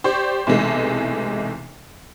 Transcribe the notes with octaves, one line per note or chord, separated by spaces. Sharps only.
G4 C5 D5 C#6
B1 C3 E3 G#3 A3